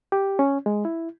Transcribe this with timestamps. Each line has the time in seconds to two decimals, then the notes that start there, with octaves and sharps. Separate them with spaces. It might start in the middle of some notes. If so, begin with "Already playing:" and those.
0.12 G4
0.39 C#4
0.66 G#3
0.85 E4